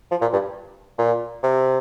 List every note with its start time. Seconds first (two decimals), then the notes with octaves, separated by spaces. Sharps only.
0.11 F3
0.21 A#2
0.33 G2
0.98 A#2
1.43 C3